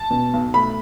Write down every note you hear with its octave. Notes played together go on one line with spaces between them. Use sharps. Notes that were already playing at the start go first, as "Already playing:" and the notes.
Already playing: A5
B2
B1
A3 B5